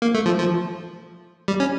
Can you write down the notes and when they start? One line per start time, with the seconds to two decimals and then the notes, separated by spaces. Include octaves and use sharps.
0.02 A#3
0.15 A3
0.26 F3
0.39 F3
1.48 G3
1.60 C#4